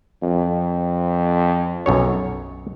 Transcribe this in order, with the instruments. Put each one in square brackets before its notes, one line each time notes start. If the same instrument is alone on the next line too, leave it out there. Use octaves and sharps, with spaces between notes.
[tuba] F2
[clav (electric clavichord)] B1 F#2 C#5